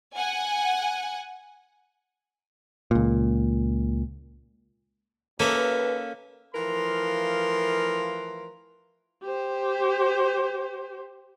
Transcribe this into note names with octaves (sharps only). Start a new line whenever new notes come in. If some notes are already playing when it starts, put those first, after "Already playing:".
F#5 G#5
C#2 A#2
D#2 A#3 C#4 A4 B4 E5
E3 F3 A3 A#4 F5 C6
G4 C5